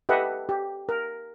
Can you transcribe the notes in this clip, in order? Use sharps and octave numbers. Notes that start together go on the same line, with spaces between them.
G4 A4 B4 D#5 E5 F#5
G4
A#4